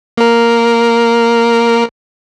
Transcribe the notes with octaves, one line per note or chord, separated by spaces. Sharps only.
A#3 A#4